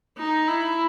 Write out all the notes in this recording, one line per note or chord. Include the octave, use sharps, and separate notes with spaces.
D#4
E4